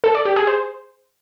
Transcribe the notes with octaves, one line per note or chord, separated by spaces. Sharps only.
A4
D5
G4
G#4
C5